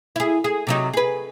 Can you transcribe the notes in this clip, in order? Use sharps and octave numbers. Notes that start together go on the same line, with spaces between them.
E4 G#4
G#4
C3 F#3 D#4
G#4 B4